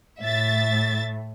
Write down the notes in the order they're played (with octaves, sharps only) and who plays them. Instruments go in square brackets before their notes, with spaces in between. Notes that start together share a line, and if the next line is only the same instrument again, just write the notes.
[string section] A2 [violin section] E5 A6